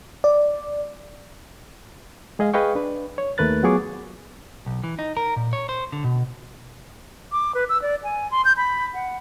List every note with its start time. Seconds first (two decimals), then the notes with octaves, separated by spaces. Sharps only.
0.24 D5
2.39 G#3 G#4 D#5 F5
2.54 G#4 B4 D#5 F5 G5 C#6
2.75 D4 B4
3.18 C#5
3.38 D#2 A3 A#4 B4 F#6 A6
3.63 F#3 B3 F4 G#4 C#6 D6
4.66 B1
4.84 E3
4.99 D#4
5.17 A#4
5.36 A#2
5.53 C#5
5.69 C5
5.92 D3
6.04 B2
7.32 D6
7.55 B4
7.69 E6
7.82 D5
8.04 G#5
8.31 C6
8.45 G6
8.57 B5
8.94 F#5